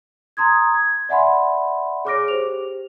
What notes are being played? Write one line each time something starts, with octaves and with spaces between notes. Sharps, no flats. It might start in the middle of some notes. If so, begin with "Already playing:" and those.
A#5 C6 D#6 G#6
G#6
D5 E5 F#5 G#5 B5 C6
G#4 C#5 D6 F6 A#6 D7
G4 C5 F7